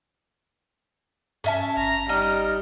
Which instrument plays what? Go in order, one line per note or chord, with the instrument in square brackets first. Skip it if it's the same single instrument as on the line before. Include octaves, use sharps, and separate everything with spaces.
[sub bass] G2 [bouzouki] C#4 E5 A5
[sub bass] G#1 [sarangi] A#5
[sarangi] G3 [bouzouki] D#4 [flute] F6